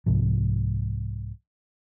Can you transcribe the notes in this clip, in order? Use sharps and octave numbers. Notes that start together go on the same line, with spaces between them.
C2 G#2 C3 F3